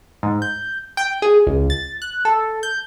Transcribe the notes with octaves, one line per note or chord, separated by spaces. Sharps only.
G#2
G6
G5
G#4
C#2
A6
F#6
A4
G6